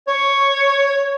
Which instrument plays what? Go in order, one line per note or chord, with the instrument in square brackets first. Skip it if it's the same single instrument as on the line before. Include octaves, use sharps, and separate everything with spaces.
[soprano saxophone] C#5 [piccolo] C#6